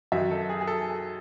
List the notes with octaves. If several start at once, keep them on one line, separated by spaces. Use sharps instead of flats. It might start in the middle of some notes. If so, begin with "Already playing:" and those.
F#2 D#3 F#3 E5
A4
G#4
G#4
A4